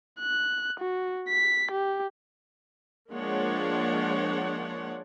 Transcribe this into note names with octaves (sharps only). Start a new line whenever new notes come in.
F#6
F#4
B6
G4
F3 G#3 A#3 D4 C#5 F#5